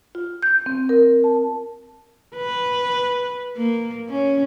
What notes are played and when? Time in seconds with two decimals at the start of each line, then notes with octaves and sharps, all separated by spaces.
0.15 F4
0.43 G6
0.66 C4
0.89 A#4
1.24 A5
2.36 B4
3.57 A#3
4.09 C#4